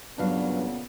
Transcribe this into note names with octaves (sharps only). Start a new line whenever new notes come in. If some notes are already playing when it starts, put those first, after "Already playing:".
G2 A#2 C#3 F#3 B3 D4 B4 F5